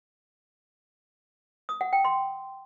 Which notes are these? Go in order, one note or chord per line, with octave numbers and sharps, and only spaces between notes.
D#6
F#5
G5
C6